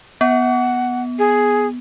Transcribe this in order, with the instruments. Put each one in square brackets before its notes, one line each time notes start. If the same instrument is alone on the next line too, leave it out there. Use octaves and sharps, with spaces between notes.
[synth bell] B3 [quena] F#5
[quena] G#4